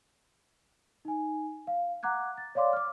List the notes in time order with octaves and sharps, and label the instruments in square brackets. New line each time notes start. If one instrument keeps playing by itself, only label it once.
[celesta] D#4 G#5
F5
F#5 A#5 D6 F#6 G#6
A6
C#5 D5 F5 C6 D6
D6 F6